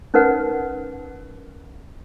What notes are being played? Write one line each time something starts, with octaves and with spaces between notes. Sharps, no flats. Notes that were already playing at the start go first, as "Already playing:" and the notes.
C#4 D#4 A#4 B4 F#5